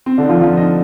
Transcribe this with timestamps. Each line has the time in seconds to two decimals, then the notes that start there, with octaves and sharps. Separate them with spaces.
0.06 C4
0.18 D3 D4
0.24 D#4
0.29 F3 F4
0.41 F3 F4
0.57 D#4 D#5